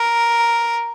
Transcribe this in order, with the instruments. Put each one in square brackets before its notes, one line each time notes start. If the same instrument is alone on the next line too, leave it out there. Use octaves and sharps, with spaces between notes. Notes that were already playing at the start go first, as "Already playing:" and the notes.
Already playing: [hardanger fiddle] A#4